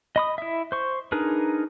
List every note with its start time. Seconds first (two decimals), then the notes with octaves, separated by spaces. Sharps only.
0.16 D#5 B5 D#6
0.38 E4 E5
0.72 C5 C#6
1.12 D4 D#4 G#4 A#4 B4